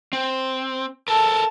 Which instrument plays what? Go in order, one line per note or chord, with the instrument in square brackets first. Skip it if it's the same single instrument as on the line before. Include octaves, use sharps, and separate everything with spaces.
[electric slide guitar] C4
[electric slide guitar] A4 A#4 [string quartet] A5